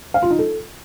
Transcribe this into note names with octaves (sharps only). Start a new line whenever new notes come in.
F5
F4
D#4
A4